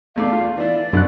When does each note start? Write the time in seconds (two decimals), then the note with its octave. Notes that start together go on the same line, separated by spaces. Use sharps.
0.16 E2 A3 D5 F5
0.32 F4
0.57 E3 E4 D5
0.93 C2 F#2 D4 F#6